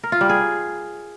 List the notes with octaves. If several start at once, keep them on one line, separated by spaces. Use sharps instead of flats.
A#4
F4
G3
G#4